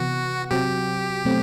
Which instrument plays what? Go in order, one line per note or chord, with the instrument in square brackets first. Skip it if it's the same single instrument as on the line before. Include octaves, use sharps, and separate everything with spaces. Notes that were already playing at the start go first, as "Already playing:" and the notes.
Already playing: [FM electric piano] C3 E3 B3 [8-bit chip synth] F#4
[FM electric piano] C3 F#3 C4 F#4 [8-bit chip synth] G4
[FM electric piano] B2 F#3 A3 C4